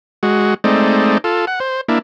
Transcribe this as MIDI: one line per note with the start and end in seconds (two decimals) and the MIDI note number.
0.23 0.54 56
0.23 0.54 66
0.64 1.18 56
0.64 1.18 57
0.64 1.18 60
0.64 1.18 63
0.64 1.18 74
1.24 1.45 65
1.24 1.45 69
1.47 1.59 78
1.60 1.81 72
1.88 1.99 58
1.88 1.99 62
1.88 1.99 64